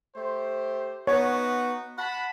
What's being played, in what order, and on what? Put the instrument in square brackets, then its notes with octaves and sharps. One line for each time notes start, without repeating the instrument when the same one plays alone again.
[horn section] A3 G4 C5
[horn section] B3 D#4 F#4 [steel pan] C#5
[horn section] F#5 A5 B5